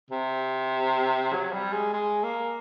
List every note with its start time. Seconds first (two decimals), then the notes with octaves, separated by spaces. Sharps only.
0.11 C3
1.33 F#3
1.53 G3
1.73 G#3
1.93 G#3
2.23 A#3